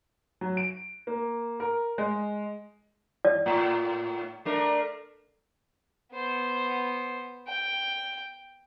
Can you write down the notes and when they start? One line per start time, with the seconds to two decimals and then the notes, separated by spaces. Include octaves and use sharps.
0.41 F#3
0.57 D7
1.07 A#3
1.60 A#4
1.98 G#3
3.25 D5
3.46 A2
4.45 A3 D4 A#4
6.12 B3 C5
7.48 G5